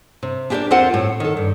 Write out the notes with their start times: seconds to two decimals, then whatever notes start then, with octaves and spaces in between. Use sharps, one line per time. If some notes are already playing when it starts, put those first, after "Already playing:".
0.23 C3
0.50 D4 E4 G4 A4 A#4 D5
0.70 E2 C4 F4 A#4 C5 F#5
0.94 A2
1.20 D#3 A4
1.37 G2